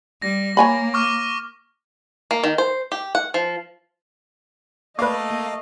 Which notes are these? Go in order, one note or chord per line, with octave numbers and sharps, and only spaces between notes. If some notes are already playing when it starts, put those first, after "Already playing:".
G3 A#6
A#3 C#5 G#5 B5
C#6 D6 F6
A#3
D#3
C5
G4
F#5
F3
A3 A#3 B4 D5 D#5 F5